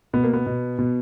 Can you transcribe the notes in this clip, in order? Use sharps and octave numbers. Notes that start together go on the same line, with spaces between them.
B2 B3
A#3
B3
B2
B2